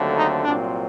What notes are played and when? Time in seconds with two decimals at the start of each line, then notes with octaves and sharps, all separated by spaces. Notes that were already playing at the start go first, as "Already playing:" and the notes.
Already playing: D#2 D3 F#3 A3 C4
0.17 D#4
0.44 C2 A#2 F#3 C4 D4